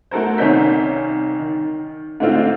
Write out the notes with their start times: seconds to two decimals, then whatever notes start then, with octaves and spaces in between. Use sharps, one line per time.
0.11 A3 F#4 A4 A#4 C5
0.38 C2 D#3 C#4 G6 B6
1.39 D#3
2.20 G#2 D3 A3 C4 F4